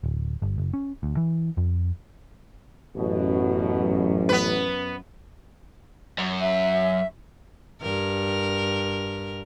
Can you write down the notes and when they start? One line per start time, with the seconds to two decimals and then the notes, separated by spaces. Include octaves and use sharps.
0.04 D1
0.42 G1
0.58 F#1
0.74 C#4
1.03 D2
1.17 E3
1.57 F2
2.96 A1 F#2 B2
4.29 B3 B4
6.18 F#2
6.41 E5
7.82 G2 A#4